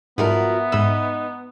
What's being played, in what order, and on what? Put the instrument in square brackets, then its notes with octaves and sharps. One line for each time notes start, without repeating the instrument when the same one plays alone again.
[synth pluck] G#2 G3 [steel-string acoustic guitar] F3 F#4 A#4 [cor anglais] B3 [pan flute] E5
[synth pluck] G#2 B5 E6 [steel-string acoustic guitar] D#4